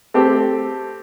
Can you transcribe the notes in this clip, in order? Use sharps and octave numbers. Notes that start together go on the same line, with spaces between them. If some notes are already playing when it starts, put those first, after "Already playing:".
A3 C4 G4 A4